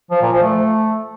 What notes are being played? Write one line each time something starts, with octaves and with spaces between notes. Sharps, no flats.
F3
A#2
F3
A3